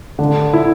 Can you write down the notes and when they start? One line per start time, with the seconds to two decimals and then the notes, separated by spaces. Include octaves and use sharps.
0.19 D3
0.54 E4